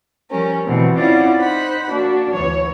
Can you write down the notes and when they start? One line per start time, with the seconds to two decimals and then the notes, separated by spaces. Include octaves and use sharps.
0.30 F3 G3 C#4 A#4
0.65 B2 D3 E3 A3 C4
0.97 C4 C#4 E4 F4 D5 F#5
1.39 D#4 C5 F#5 B5
1.89 A#3 D4 F#4
2.33 D2 E3 C#5